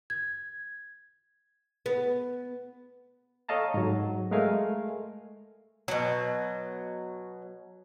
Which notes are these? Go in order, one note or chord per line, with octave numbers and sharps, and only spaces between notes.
G#6
B3
A4 C#5 D#5 F5 A5 A#5
G#2 F#3
G#3 A3 A#4 F5 G#5
B2 F#3